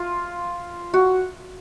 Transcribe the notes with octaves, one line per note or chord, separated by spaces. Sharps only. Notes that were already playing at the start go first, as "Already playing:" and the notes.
Already playing: F4
F#4